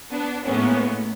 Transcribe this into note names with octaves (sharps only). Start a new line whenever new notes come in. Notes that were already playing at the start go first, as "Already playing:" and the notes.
B3 D4
A2 G#3 A#3 B3 C#4